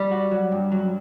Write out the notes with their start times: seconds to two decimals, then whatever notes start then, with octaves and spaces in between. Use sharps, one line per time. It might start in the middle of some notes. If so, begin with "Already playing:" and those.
Already playing: G3
0.11 F#4
0.31 F#3
0.52 G2
0.72 F#3